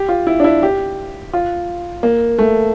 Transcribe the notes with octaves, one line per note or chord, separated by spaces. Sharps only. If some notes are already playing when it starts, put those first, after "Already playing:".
Already playing: G4
F4
E4
D4
E4
G4
F4
A#3
A3